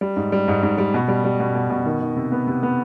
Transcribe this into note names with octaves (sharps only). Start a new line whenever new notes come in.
G3
G#2
G3
G#2
G#2
G3
B2
G3
G3
B2
B2
B2
D#3
D#3
C3
B3
C3
B3